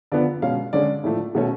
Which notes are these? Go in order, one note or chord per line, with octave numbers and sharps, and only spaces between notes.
D3 F3 B3 D5
B2 G#3 C#4 F5
D3 G#3 C#4 D5
A2 F3 A3
B2 A3 C#4